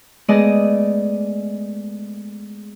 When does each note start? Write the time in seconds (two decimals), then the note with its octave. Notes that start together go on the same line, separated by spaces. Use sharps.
0.28 G#3 A3 B3 G#4 D5 D#5